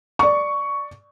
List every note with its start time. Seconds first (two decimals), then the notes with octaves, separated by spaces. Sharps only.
0.19 D5 C#6